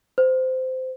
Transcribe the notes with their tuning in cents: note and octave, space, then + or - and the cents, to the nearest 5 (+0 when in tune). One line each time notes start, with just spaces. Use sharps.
C5 -15